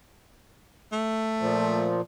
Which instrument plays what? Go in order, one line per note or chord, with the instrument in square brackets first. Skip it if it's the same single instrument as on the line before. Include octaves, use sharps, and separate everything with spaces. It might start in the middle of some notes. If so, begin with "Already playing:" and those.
[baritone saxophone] A3
[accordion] A#2 F3